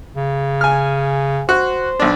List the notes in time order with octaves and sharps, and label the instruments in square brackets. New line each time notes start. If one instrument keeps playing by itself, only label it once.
[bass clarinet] C#3
[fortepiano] G#5 F6
[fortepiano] F#4 [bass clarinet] C5
[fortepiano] B1 D4